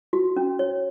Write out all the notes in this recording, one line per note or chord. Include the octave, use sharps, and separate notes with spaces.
F#4
C#4
C#5